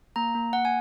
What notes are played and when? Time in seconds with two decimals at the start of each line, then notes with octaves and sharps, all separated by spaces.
0.16 A#3 A#5
0.35 A#3
0.53 A#3 F#5
0.65 G#5